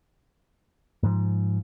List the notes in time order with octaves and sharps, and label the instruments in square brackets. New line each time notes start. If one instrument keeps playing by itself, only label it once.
[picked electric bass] G#2 F3